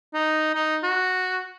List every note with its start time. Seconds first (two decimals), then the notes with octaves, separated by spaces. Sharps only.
0.14 D#4
0.54 D#4
0.83 F#4